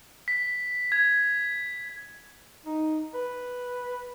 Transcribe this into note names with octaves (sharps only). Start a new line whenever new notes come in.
B6
G#6
D#4
B4